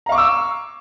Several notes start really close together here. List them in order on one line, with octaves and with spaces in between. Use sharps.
A#5 F5 C#6 D6 E6